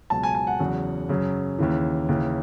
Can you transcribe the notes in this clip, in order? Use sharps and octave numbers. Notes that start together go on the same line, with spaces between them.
C#2 B2 F#3 A5
G#5
G#5
F#5
E2 C#3 F#3
F#2 C#3 F#3
D#2 C#3 E3
D#2 C#3 E3